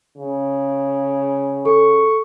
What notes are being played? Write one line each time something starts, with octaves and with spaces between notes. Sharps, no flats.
C#3
A4 C#6